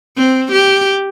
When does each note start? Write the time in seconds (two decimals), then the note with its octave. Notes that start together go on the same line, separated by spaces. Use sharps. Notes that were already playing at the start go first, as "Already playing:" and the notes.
0.17 C4
0.52 G4